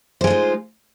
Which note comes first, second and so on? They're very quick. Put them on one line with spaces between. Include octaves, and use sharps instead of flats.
C5 G#3 F4 D#4